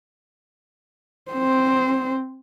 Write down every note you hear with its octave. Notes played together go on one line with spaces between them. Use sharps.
C4 C5